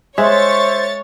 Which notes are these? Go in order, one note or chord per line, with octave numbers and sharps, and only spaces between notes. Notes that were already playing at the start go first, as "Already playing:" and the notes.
G#3 C5 C#5 E5 C#6 A6